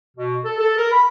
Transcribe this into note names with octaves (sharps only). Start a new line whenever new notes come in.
B2
A4
A4
A#4
B5